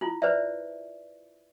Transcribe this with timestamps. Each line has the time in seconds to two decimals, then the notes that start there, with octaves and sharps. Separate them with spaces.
0.01 E4 F4
0.22 B4 C5 D5 E5